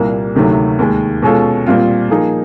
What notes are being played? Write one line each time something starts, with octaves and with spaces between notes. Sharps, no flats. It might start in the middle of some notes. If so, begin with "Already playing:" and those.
Already playing: C2 A#2 G3 A#3
D2 C3 D#3 F#3 A3
D#2 D#3 G#3
B2 G#3 C#4 F4 A4
A#2 G3 C4 F4
F3 A#3 D#4 G#4